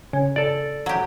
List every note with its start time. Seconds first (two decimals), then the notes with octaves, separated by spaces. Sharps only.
0.13 C#3
0.36 A4 D5
0.86 F#3 G4